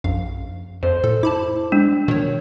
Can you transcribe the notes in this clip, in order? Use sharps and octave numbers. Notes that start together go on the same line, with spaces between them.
A#1 F#2 F5
F2 C5
A#2 A4
E4 A5 B5 D6
G#3 D4
B2 D#3 C#5